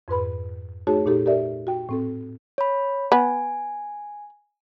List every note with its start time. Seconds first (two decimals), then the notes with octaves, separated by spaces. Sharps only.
0.08 F2 G#2 B4 B5
0.87 A3 D#4 F#4 G#4 C#5 A5
1.06 A#2 D#4 G4 A4
1.26 G4 A#4 D5 E5
1.67 F#4 G5
1.89 A2 C4 A4
2.58 C#5 B5
3.12 B3 G#5